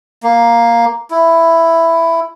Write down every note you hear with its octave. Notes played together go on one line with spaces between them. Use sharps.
A#3
E4